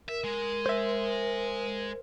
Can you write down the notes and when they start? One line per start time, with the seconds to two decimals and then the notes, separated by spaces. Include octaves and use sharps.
0.09 A#4 E5
0.24 G#3
0.66 C5 E5